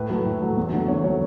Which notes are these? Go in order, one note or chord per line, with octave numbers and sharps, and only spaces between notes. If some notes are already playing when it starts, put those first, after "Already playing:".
Already playing: A2 B4
F#3 A3
A2
F#3 A3
E2
D3 F#3 A3
E2 C#5
D3 F#3 A3 C#5